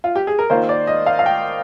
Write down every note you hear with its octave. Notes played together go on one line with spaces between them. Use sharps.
F4
G4
G#4
A#4
D#3 A#3 F4 C5
D5
D#5
F5
F5
G5